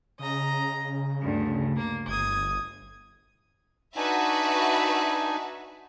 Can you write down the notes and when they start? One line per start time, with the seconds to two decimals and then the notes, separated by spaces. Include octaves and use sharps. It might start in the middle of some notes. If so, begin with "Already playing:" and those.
0.19 C#3 D#5 A#5
1.21 D2 G2
1.77 A#3
2.07 G1 D#6 G#6
3.96 D4 D#4 F#4 B4 E5 G#5